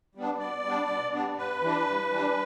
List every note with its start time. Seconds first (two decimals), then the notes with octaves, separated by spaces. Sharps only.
0.15 G3 B3 D4
0.39 B2 D5
0.65 G3 B3 D4
0.88 B2
1.13 G3 B3 D4
1.37 G2 B4
1.62 E3 G3 D4
1.87 G2
2.11 E3 G3 D4